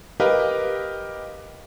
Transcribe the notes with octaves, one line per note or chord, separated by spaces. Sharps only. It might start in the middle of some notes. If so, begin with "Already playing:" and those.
G4 A#4 B4 D#5 F5